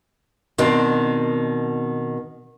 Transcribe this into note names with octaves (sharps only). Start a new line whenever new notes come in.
B2 D#3 C4 D4